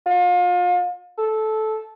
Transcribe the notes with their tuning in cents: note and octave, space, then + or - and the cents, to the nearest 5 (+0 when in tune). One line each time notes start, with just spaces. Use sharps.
F4 +35
A4 -15